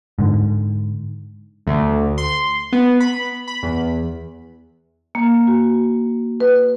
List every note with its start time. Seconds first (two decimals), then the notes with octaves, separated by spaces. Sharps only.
0.19 G#2 D3
1.67 D2
2.18 C6
2.73 B3
3.00 B5
3.48 B5
3.63 E2
5.15 A#3
5.47 F#4
6.40 B4